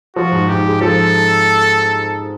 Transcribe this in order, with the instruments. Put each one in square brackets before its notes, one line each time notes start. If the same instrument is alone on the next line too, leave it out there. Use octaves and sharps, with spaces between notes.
[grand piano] F3 [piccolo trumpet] F#4
[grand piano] G#2
[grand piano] G#2 [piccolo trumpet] G4
[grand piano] G#3
[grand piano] F3 [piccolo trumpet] A4